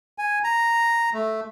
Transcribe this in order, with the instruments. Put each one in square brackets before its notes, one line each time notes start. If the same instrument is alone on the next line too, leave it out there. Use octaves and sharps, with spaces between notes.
[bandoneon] G#5
A#5
A3